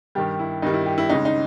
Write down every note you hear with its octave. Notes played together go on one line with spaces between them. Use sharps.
G2 D#3 G3 G4
E4
G2 D#3 G3 D#4
E4
G4
E4
C#2 C#3 G#3 D#4
D#4